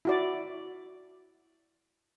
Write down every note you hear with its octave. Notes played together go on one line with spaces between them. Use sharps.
E4 F#4 D5